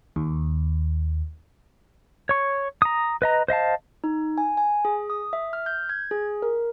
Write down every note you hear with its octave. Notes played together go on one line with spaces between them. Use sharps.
D#2
C#5 C#6
A#5 D#6
B4 D#5 A#5
C5 D#5 F5 A5
D#4
G#5
G#5
G#4
D#6
E5
F6
G6
G#6
G#4
A#4